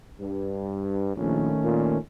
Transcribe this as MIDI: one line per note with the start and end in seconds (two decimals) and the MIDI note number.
0.20 1.12 43
1.16 1.53 34
1.16 1.98 51
1.16 1.98 57
1.16 1.98 61
1.63 1.96 46